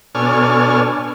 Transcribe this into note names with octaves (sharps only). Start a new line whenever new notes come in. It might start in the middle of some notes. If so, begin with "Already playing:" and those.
B2 D4 A4 C#5 G#5 F6